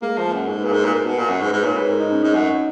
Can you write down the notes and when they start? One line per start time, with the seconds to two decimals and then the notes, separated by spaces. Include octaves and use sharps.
0.02 G#3 A#3
0.18 F3
0.26 A#3
0.33 F#2
0.48 G#2 G#4
0.59 B4
0.65 A#2
0.71 G#2 A#4
0.84 A#2 B4
0.94 G#2 A#4
1.06 B2
1.18 A#2
1.29 F#2
1.41 G#2 B4
1.53 G#2 B4
1.64 A#2 C#5
1.76 G#2 B4
1.89 A#4
2.00 D#4
2.12 C#4
2.22 G#2 D#4
2.34 F#2